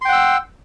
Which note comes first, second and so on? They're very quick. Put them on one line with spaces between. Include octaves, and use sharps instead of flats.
C6 G5 F#5 E6